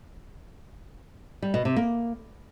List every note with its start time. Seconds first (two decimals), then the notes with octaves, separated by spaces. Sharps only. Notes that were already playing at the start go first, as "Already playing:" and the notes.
1.42 G3
1.54 B2
1.65 C3
1.76 A#3